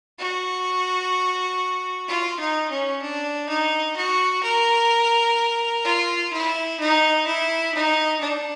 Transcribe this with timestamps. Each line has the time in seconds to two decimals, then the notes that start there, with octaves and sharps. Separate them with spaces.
0.19 F#4
2.08 F4
2.39 D#4
2.71 C#4
3.02 D4
3.49 D#4
3.96 F#4
4.43 A#4
5.84 F4
6.32 E4
6.80 D#4
7.27 E4
7.74 D#4
8.21 D4